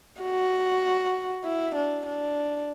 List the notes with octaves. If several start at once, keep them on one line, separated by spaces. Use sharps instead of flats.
F#4
E4
D4
D4